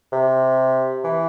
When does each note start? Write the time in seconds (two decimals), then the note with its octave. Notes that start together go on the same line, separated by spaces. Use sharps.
0.13 C3
1.04 E3